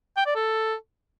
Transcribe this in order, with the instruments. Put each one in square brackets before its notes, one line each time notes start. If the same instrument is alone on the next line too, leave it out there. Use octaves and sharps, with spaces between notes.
[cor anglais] G5
D5
A4